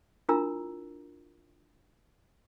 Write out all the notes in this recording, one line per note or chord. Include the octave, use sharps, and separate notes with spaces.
D4 E4 F4 A#4 A#5 E6